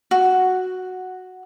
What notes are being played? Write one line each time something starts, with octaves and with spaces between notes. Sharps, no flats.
F#4